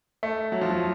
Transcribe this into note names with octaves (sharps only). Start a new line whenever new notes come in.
A3
F#3
F3
F#3